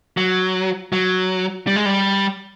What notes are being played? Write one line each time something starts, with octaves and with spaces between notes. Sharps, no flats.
F#3
F#3
G3
G#3
G3